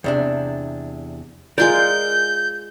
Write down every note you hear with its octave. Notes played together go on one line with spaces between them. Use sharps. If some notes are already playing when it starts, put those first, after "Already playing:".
E2 C3 D4
G#3 F4 A#4 D5 G6